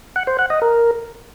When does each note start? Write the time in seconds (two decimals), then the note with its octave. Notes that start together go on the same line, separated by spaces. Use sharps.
0.16 F#5
0.27 C5
0.39 F#5
0.50 D#5
0.62 A#4